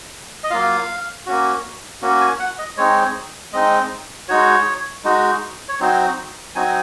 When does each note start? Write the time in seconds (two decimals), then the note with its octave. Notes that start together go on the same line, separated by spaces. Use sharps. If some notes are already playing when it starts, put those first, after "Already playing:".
0.44 D#5
0.50 F#3 A#3 F4 F5
1.26 A#3 C#4 F#4
2.02 A#3 C#4 F#4
2.21 G#5
2.39 F#5
2.59 D#5
2.77 G#3 C4 D#4 C#5
3.53 G#3 C4 D#4 D#5
4.28 G#3 D#4 F#4 C#5
5.04 G#3 D#4 F#4
5.69 C#5
5.80 F#3 C4 D#4 F#4 C5
6.55 F#3 C4 D#4 F#4 G#5